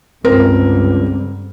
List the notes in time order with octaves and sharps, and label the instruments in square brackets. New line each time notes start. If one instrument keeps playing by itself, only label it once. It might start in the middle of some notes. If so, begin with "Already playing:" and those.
[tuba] C#2 [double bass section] G2 D3 G3 [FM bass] C4 [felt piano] A#4